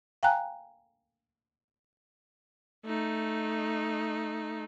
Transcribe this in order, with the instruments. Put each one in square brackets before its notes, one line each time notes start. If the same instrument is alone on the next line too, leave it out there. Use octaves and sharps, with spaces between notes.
[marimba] F5 G5 G#5 A#5 F#6
[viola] A3 D#4